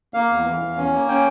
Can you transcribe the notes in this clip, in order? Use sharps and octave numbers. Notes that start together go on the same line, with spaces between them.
A#3 F5
E2
E3
E2
C#4
A#3
C#4 G5